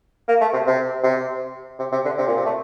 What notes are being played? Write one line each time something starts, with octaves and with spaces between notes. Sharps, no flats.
A#3
A3
C3
C3
C3
C3
C3
D3
C3
A#2
C3
A3